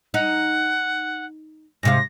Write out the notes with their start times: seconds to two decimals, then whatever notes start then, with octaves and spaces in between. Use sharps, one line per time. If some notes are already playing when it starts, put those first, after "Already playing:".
0.14 D#4 F#5
1.83 G#2 C3 F5 A#6